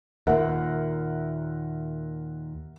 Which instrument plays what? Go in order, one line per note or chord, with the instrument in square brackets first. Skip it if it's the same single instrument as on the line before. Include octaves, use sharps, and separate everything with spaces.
[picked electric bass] D#2 A#2 [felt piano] A#4 E5 F#5